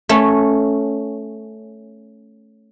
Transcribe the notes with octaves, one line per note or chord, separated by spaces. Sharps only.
A3 C#4